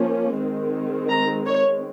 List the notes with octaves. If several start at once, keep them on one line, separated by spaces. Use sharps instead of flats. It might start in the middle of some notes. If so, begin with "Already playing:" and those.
Already playing: F3 A#3 C#4
D#3 G#3 C4
A#5
C#5